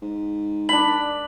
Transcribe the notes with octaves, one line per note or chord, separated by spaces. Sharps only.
G#2
D4 B5 F#7